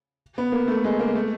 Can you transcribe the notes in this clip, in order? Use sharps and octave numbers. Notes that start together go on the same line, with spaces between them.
B3
A#3
A3
G#3
A#3
A3